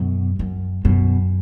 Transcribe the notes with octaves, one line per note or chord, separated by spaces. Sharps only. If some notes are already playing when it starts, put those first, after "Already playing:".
Already playing: F#2 B2
F#2
F#2 B2